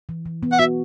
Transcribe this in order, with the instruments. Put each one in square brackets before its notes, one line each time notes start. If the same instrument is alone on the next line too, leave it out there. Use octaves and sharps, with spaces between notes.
[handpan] E3
E3
B3
[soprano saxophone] F#5
[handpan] F#4 [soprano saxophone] E5